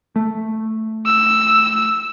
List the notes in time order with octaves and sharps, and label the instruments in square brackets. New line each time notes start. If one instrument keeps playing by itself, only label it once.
[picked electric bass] A3
[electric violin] E6